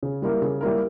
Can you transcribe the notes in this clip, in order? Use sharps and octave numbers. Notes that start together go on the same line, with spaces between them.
C#3
G3 A#3 E4 A#4
C#3
G3 A#3 E4 A#4